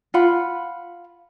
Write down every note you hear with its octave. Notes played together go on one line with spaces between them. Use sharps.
F4 F#5 B5